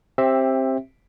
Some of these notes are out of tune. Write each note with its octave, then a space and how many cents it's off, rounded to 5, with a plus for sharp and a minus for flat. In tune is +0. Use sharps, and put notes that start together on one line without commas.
C4 +20 G4 +0 E5 -5